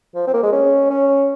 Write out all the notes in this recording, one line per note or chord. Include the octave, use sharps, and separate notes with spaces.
F3
C4
A#3
G#3
C#4
C#4